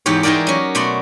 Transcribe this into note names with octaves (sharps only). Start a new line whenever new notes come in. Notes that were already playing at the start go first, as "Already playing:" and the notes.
E2 G#2 G4 C#5
E3 G#3 D#4 G4 A#4 D5
F#3 C#4
B2 A3 D5 F#5 C6